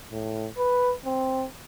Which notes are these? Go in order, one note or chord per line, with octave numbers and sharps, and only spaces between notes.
A2
B4
C4